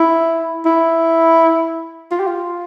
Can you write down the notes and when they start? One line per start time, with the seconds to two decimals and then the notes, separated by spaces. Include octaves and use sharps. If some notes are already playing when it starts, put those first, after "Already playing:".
Already playing: E4
0.66 E4
2.11 F4
2.20 G4
2.27 F4